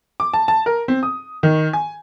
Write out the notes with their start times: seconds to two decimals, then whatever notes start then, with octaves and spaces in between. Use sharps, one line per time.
0.20 D6
0.33 A5
0.48 A5
0.66 A#4
0.88 C4
1.03 D#6
1.43 D#3
1.73 G#5